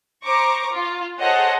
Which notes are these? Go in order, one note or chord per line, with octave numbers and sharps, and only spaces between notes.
C5 A#5 C#6 D6
F4
G#4 A4 C5 C#5 D#5 F#5